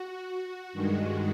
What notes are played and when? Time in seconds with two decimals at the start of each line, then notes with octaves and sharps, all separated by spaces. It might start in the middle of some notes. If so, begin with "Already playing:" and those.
Already playing: F#4
0.73 G2 D#3 G#3